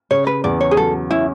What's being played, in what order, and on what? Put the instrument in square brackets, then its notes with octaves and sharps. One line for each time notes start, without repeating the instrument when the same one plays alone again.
[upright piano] C#3 [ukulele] C#5
[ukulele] B4
[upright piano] E2 [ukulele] D5
[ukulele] C#5
G#4
[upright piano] F#3 [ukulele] A4
[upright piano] C#4 [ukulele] E4